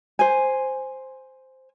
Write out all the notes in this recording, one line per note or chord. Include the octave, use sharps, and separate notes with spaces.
C5 G#5